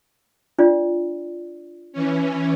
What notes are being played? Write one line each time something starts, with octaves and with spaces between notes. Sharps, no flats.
D4 F4 D5
E3 C#4